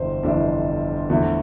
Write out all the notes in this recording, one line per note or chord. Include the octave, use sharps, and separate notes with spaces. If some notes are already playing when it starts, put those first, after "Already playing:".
Already playing: G1 F2 C3 E3 C5
G1 F2 C3 E3 D4
E2 D3 F3 A3